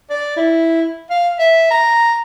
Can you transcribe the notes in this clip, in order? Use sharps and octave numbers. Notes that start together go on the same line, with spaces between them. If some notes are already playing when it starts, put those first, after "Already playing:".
D5
E4
F5
E5
A#5